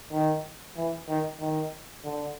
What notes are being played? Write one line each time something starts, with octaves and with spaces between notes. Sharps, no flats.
D#3
E3
D#3
D#3
D3